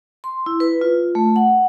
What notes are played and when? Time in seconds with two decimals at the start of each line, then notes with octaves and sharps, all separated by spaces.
0.24 C6
0.46 E4
0.60 B4
0.81 F4
1.15 A3
1.36 F#5